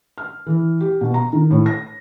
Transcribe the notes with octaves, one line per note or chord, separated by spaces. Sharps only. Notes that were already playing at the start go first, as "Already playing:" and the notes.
F6
E3
G4
B2
A#5
D#3
A2
A#6